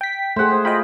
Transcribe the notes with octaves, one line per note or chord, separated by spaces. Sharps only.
G5 B6
A3 G#4 C5 F#5
C5
F4 D#5 G5 B5